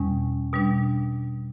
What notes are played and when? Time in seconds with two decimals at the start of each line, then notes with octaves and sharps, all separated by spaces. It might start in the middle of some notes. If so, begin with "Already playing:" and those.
Already playing: E2 B2 G3 C#4
0.53 B2 G3 D4